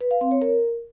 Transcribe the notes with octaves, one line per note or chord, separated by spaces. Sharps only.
B4
F5
C4
C#5
A#4